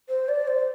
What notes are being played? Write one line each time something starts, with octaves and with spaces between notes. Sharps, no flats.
C5
D5
C5